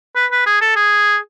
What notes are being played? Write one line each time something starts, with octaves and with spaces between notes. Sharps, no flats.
B4
B4
G#4
A4
G#4